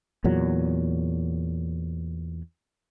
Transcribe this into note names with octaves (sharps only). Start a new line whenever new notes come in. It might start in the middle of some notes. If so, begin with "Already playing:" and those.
E2 A#2 F#3